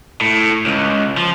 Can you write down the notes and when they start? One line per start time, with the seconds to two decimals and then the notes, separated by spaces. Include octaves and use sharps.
0.21 A2
0.66 C#2
1.18 F3